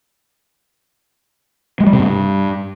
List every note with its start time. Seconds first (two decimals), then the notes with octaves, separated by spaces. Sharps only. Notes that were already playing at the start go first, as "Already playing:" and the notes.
1.80 G#3
1.87 G3
1.93 C3
1.99 G2